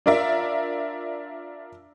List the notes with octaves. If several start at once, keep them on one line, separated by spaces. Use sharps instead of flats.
D4 F4 A#4 D5 E5